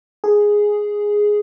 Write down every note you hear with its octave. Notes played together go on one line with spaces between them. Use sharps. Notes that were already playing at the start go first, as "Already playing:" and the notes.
G#4